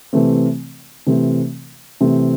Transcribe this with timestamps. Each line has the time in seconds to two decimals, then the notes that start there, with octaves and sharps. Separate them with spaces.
0.13 C3 E3 A3 C4
1.07 C3 E3 A3 C4
2.01 C3 E3 A3 C4